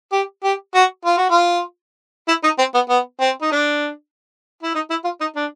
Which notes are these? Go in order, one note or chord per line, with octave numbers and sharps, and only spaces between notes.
G4
G4
F#4
F4
F#4
F4
E4
D#4
C4
B3
B3
C4
D#4
D4
E4
D#4
E4
F4
D#4
D4